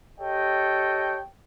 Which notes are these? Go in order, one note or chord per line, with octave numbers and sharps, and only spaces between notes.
G4 A4 C#5 D#5 G5